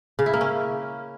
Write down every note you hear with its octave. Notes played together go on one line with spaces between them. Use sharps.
C#3
E4
A#3
C#4